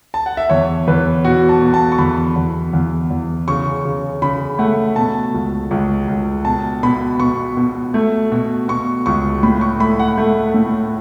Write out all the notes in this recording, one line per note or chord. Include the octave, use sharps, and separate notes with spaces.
A5
F#5
E5
E2 C#5
E2 B4
B2 F#4
A5
B2
A5
C#6
E2 B5
E2
E2
E2
C#3 C#6
C#3
C#3 B5
A3 F#5
B2 A5
C#2
C#2
C#2
B2 A5
B2 B5
B2 C#6
B2
A3
B2
B2 C#6
C#2 C#6
A2 B5
C#6
A3 B5
F#5
A3
A2